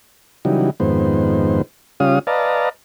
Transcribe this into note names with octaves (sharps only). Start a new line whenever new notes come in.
C#3 E3 F#3 G3 D#4
F2 G#2 D#3 B3 C5
C#3 G3 C#4 F4 F5 D#6
B4 D5 D#5 F5 A5 A#5